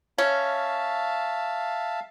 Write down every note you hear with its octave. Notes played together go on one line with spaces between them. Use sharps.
C#4 E5 F5 A5